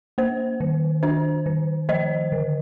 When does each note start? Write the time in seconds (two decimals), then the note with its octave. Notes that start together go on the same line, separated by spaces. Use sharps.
0.18 A#3 C5
0.60 D#3
1.03 D4 C5
1.46 D#3
1.89 F3 C5 D#5
2.32 D3